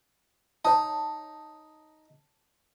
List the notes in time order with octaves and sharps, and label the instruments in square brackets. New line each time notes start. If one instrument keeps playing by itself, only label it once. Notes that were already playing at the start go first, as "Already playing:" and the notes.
[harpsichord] D#4 [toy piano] C#5 A5